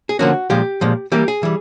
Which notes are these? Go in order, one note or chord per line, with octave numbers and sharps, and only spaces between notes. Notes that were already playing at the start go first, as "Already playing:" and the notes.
G#4
D3 F3 A#3 C#4 F#4
A#2 F3 G#3 G4
A#2 F3 G#3
E3 G3 A#3 G4
G#4
E3 G3